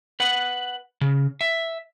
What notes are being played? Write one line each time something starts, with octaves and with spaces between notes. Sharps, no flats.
B4 F#5
C#3
E5